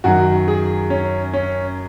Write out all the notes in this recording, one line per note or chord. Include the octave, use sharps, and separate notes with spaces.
F#2 D#3 F#3 F#4
G#4
C#4
C#4